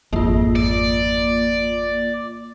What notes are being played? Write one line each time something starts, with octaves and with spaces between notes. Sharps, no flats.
G#1 F2 A#3 F4
D5